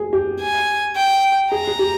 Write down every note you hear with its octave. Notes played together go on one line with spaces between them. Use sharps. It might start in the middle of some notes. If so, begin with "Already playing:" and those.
Already playing: G#4
G4
G#5
G5
G#4 A#5
G#4
G4